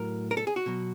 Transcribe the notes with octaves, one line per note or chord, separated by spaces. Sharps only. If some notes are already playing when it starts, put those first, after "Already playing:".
Already playing: A2 F#3 A#4
A#4
A4
G#4
F#4
B2 F#3